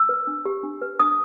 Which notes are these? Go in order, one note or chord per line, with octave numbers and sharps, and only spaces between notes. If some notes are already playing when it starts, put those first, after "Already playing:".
Already playing: E6
B4
D4
G4
D4
B4
D4 D#6